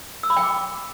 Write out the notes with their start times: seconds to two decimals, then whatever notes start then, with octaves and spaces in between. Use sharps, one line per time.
0.23 E6
0.30 B5
0.37 G5
0.43 D6